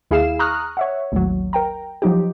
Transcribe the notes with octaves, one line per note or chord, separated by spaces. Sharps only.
D#2 E4 G#4 F5 C7 E7
A#5 C#6 D#6 F6 F#6
C#5 E5 F#5
A1 D#2 F#3
A#4 G5 A#5
F3 F#3 D#4 G4